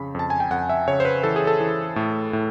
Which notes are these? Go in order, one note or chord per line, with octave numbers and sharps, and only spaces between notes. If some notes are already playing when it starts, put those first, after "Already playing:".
Already playing: F2 C#3 B5
F2 A5
G#5
G5
F2 F#5
E5
C#3 C#5
C5
B4
E3 A4
G#4
A4
E3
A2
A2